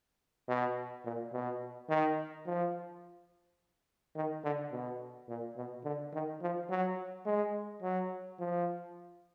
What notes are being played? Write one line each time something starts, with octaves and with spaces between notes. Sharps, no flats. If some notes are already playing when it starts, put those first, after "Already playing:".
B2
A#2
B2
D#3
F3
D#3
D3
B2
A#2
B2
D3
D#3
F3
F#3
G#3
F#3
F3